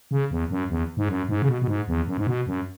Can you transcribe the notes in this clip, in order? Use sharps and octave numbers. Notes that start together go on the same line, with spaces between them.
C#3
E2
F#2
E2
G#2
F#2
G#2
C#3
B2
B2
G#2
E2
F#2
G#2
B2
F#2